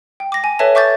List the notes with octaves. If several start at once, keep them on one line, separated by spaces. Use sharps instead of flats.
G5
D6 A#6
G#5
A4 B4 C#5 E5 A5
E5 C#6 D6 G6 A6